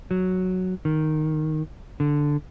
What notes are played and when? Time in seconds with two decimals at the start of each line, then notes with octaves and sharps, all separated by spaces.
0.11 F#3
0.85 D#3
2.00 D3